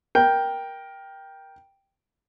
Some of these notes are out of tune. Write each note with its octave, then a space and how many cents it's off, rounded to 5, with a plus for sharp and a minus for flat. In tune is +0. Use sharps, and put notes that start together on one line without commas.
A#4 +15 G5 +0